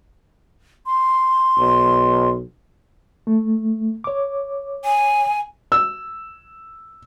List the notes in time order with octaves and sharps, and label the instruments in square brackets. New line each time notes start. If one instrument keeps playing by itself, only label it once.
[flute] C6
[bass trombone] B1
[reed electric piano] A3
C#5 D6
[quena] G#5
[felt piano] E6